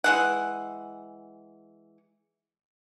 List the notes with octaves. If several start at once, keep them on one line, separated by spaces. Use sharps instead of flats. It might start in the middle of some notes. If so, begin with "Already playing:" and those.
E3 G#3 F#5